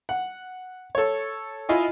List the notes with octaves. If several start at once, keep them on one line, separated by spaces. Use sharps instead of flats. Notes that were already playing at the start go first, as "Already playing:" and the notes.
F#5
A4 C#5
E4 F4 D#5 G#5